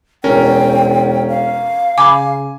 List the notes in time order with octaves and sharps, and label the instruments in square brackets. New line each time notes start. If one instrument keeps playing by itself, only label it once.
[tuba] E1 [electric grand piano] C#4 A#4 [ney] G5
[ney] F5
[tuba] C#3 [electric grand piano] G#5 [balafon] B5 D6